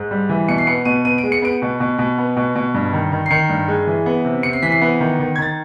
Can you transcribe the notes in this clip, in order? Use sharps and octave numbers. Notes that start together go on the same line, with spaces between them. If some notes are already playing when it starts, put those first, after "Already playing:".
Already playing: G#2
G3
E3
B2 C#7
C7
B3 C#7
B2 D#7
B3 D#7
D7
G#3
C#7
B3 D7
B2
B2
B2
B3
B2
B2
G2
D#3
D#3
C7
D#3 C#7
G2
G#3
E3
B3
C3
C3 C#7
C7
E3 B6
C7
B3
D#3
D#3
G#6
D#3 A6